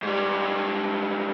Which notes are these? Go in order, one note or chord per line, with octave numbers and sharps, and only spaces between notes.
G#2 G3